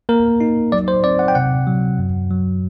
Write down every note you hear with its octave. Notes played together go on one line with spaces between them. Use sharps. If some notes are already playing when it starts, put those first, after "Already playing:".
A#3 A#4
D#4
F#3 D5
C5
C4 D5
F#5
G5
C3 F#5
F#3
F#2
F#3